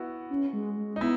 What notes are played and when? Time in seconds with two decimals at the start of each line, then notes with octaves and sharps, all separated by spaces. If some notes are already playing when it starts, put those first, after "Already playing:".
Already playing: B3 E4 F#4
0.30 C#4
0.53 G#3
0.77 G#3
0.96 D#4
1.01 B3 E4